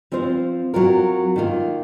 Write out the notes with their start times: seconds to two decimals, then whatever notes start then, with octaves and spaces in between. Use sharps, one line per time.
0.12 F3 C4 F4 C5
0.74 F#3 C4 F4 A#4
1.36 D#3 A#3 F4